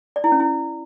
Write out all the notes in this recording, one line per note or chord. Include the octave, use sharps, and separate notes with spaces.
D5
E4
C#4
E4